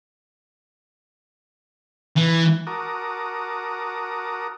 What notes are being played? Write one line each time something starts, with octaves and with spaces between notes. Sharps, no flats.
E3
F#4 A#4 A5 A#5 D6 D#6